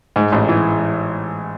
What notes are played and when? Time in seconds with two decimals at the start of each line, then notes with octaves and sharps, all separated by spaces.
0.16 G#2
0.32 A1
0.49 E3